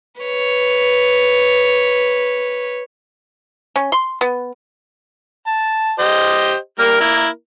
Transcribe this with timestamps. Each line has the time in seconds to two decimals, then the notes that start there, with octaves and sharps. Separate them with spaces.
0.21 B4 C#5
3.76 C#4
3.92 C6
4.21 B3
5.47 A5
5.99 G4 C5 D#5
6.79 G3 A#3 A#4
7.00 A#3 E4 A#4